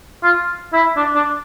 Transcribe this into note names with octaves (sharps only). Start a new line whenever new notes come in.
F4
E4
D4
D4